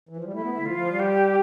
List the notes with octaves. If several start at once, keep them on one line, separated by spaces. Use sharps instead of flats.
E3
F3
G3
A3 E4
B3
A3
D3
F3 F4
F3
G3
G4